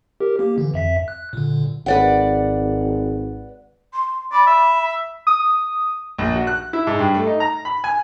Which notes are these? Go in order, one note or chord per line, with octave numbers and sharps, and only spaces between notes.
G4 A#4
A#3 G4
D3 E3
F2 E5 B6
F#6
A#2 D3
G#1 B4 D5 F#5
C6
D5 B5
E5
D#6
A#1
F#4
F#6
E4
G#2
G2
A3
D#4
A#5
B5
G#5